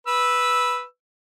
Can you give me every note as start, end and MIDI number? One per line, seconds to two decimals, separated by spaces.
0.07 0.83 71
0.07 0.83 88